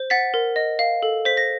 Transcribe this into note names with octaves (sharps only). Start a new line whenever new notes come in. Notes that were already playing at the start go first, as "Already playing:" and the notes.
Already playing: C5
F#5 A6 B6
A#4
D#5
F5
A4
C5 B6
A#6